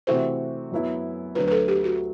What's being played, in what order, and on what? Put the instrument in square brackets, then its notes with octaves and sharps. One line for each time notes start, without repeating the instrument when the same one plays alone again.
[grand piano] C3 E3 A3 C4 F#4 [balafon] C5
[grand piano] F#2 F#3 B3 E4
[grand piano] D2 D3 F#3 [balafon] B4
[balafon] B4
A4
G4
F#4